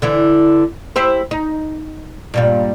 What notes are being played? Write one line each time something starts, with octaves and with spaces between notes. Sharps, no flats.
D3 E3 E4
E4 G4 C5
D#4
G2 A#2 G3